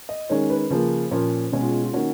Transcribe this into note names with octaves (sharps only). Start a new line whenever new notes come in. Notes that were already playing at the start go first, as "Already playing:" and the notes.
D#5
D#3 G#3 C#4 C#5
B4
C#3 F3 A#3
A#2 F3 A#3 C#4
B2 G#3 C#4 G#4
F4
F4
F4
D#3 A#3 C#4 F#4